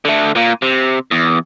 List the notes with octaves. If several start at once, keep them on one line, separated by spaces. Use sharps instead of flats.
D3 A3
A#2 A#3
C3
E2